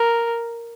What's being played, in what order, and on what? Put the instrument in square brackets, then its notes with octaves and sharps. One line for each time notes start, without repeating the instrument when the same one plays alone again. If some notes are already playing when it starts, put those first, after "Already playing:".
Already playing: [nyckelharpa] A#4